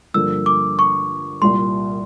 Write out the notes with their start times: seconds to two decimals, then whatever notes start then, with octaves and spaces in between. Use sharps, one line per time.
0.14 G2 D3 F3 A#3 E6
0.46 D6
0.79 C#6
1.42 C2 A#2 G3 C6